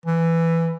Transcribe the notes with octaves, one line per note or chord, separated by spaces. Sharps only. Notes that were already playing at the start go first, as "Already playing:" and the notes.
E3